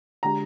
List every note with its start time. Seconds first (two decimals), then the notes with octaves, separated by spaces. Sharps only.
0.23 D3 G#3 D4 G4 A#5